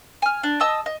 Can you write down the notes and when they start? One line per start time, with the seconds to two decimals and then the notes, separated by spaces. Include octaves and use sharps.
0.22 G#5 F6
0.43 D4
0.60 D#5 A5 D#6 E6
0.86 D#5